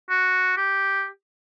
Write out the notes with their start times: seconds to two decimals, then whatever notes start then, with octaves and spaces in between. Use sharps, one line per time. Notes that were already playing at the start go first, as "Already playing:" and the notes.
0.10 F#4
0.57 G4